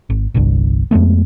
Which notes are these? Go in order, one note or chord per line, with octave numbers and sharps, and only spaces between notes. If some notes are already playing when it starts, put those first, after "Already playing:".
G#1
G1 C2 G2
F2 G#3 A3 B3